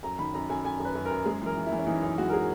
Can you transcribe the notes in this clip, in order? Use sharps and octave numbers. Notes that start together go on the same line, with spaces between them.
F#2 A#5
D#3 B5
F#2 A#5
F#2 G#5
F#2 G#5
F#2
B4
F#2
A#4
F#2
G#3 G#4
E3 A#4
E3
E4
E3
C#4
E3 D#4
F#2 D#4
G#3 F#4
A#4
G#4